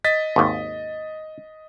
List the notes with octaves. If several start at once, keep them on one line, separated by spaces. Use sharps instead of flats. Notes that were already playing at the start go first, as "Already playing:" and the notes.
D#5 A6 B6
G#1 D#2